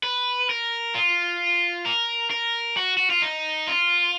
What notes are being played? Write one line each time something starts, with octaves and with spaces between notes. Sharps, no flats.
B4
A#4
F4
A#4
A#4
F#4
F#4
F4
D#4
F4